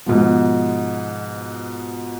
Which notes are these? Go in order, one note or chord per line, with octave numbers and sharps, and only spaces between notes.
G#2 B2 F3